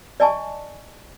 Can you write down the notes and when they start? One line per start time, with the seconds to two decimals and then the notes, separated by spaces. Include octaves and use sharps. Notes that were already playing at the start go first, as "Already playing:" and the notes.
0.20 D5 D#5 G#5 A5 C#6